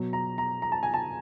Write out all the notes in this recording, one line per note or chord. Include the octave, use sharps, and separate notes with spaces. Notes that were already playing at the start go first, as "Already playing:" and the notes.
Already playing: B2 F#3
A#5
A#5
A#5
A5
G#5
A5